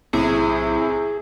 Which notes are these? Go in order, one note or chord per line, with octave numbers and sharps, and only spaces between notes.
B1 A2 C3 E4 G#4